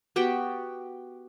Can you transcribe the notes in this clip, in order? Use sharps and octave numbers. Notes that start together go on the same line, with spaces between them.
B3 F#4 G4 G5